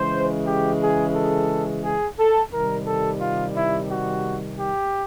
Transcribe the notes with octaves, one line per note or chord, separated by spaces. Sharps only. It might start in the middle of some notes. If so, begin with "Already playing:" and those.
Already playing: C#3 E3 G#3 C5
G4
G#4
A4
G#4
A4
C3 D#3 G3 A#4
A4
F4
E4
F#4
G4